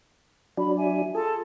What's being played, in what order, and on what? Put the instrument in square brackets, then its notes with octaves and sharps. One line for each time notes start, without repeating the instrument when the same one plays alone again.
[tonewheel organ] F#3 D4 [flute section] B5
[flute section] E5 G#5
[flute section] F4 A4 A5 [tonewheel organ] G#4